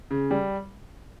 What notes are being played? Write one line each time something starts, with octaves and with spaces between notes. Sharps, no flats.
C#3
G3